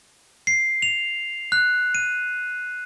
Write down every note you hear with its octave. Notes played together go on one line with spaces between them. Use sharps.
C7
F7
F#6
D#7